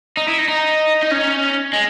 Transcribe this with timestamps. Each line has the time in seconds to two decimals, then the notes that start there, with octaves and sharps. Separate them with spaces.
0.17 D#4
0.28 E4
0.38 D#4
0.48 D#4
1.03 D#4
1.11 C#4
1.73 G#3